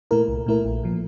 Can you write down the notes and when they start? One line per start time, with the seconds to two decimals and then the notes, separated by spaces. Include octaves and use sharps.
0.11 A#2 A3 E4 A#4
0.28 C2
0.46 A#2 A3 E4 A#4
0.65 A#1
0.83 A#2 F3